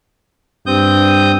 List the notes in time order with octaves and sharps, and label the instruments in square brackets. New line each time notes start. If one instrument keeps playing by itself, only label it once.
[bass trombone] G2 [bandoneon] C4 D#6 G6